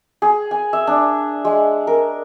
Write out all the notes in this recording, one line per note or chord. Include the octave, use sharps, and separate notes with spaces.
G#4
G#5
E5
D4
G#3
A#4